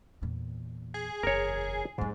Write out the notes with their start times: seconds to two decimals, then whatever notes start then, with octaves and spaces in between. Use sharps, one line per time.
0.22 E2 A#2
0.94 G#4
1.23 F#1 E2 A#4 C#5
1.98 F2 G#2 G3